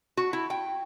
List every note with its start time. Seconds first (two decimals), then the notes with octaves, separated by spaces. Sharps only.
0.17 F#4
0.33 E4
0.50 G5